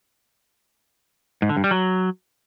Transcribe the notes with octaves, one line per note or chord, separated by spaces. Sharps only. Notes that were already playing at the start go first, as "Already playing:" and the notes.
G#2
D3
G2
G3
F#3